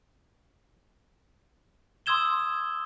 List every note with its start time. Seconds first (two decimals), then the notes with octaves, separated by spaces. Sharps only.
2.06 C6 D#6 E6 G#6 E7 G7